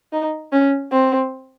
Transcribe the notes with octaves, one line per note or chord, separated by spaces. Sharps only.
D#4
C#4
C4